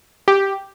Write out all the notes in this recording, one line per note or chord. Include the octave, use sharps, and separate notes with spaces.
G4